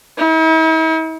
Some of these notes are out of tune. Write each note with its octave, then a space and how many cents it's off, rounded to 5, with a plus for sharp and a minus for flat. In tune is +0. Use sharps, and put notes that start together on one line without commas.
E4 -45